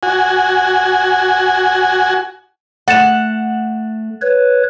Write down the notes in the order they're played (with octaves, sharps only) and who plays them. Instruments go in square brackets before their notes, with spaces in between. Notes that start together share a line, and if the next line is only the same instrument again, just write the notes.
[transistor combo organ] F#4 G#5
[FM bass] A3 [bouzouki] F#5 [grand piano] A6 E7
[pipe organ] B4 C#5